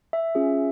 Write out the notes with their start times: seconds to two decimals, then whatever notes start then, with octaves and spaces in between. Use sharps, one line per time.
0.13 E5
0.35 C#4 F4 G#4